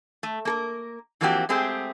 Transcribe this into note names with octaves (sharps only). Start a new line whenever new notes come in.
A3
A#3 A4 A#4
E3 F3 A#3 C4 F#4 G4
G#3 A3 C4 G4 G#4